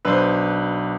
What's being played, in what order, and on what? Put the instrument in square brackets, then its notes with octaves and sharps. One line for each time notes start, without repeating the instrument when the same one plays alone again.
[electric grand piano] B1 D4 E6 [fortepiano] B4 C5